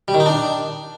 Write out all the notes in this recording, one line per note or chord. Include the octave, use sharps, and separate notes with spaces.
G3
D#3
D#4
D4